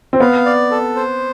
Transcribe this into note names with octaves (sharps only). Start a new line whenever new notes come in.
C4
B3 F5
D5
A4
C5